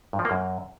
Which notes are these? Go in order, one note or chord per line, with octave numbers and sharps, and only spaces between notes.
G2
F3
A#3
F#2